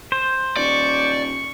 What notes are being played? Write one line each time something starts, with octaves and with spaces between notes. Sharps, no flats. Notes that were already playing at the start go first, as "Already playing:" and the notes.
C5
D#1 D5 C#6